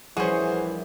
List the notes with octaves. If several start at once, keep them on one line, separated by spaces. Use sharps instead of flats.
A#1 E3 G3 C#4 F#4 G#4 C5 D#7